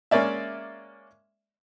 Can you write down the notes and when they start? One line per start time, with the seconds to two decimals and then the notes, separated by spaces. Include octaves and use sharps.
0.11 G#3 A#3 C#4 D5 E5